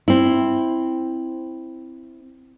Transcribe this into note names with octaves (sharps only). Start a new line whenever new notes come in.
C4 E4